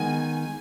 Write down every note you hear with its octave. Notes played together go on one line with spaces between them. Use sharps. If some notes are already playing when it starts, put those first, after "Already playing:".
Already playing: D#3 G#3 B3 G#5